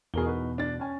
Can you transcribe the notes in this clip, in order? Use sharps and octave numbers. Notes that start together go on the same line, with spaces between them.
E2 B2 G#4 A#4 G7
D#4 F#4 B4
D4 A6
C#4 G#5